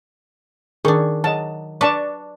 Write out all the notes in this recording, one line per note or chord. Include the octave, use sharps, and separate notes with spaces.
D#3 D4 G#4 C#6
F#3 D#5 A5
D4 B4 D5 A5 C#6